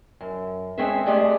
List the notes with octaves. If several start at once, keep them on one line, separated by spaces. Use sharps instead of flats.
F#2
G#3 C4 C#4 G#4 B4 E5
G#3 A3 G4 G#4 D5 D#5